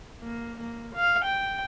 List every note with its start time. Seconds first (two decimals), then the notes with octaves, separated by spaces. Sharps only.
0.22 A#3
0.60 A#3
0.95 F5
1.25 G5